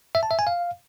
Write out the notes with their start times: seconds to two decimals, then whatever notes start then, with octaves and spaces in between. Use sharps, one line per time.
0.15 E5
0.23 A5
0.31 E5
0.39 G#5
0.47 F5